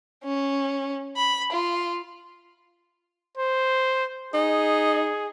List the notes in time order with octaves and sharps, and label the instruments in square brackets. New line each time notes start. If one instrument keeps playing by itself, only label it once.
[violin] C#4
B5
F4
[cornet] C5
[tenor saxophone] D#4 [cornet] G#4